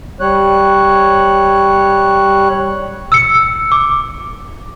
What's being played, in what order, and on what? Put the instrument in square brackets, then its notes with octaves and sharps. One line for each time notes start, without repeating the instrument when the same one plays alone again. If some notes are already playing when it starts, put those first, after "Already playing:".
[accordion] G3 C#5 F#6
[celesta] E6 C#7
D6